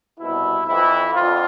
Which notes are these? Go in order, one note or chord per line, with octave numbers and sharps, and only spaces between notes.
C2 B2 E4
F2 E3 E4
F2 D3 F4